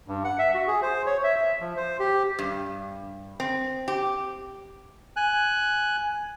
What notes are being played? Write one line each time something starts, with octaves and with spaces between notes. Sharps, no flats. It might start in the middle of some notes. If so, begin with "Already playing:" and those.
G2
F#5
E5
F#4
G#4
C5
C#5
E5
E5
F3
C5
G4
G2
C4
G4
G#5 F#6